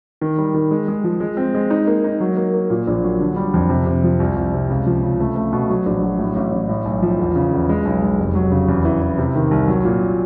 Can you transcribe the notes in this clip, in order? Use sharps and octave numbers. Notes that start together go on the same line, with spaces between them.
D#3
G3
D#3
G#3
G#3
F3
G#3
C4
G#3
D#4
A#3
D#4
F#3
A#3
A#3
A#2
A#1
F#3
D3
G3
F2
C3
C3
F3
C2
C2
C3
C#2
F3
C#3
A3
A3
B2
F#3
A#1
F#3
A2
A1
A1
A2
B1
F3
E2
C#3
E2
G#3
B1
G#3
F1
F#3
C#3
E2
E3
E3
C3
D#3
C2
F#3
A#2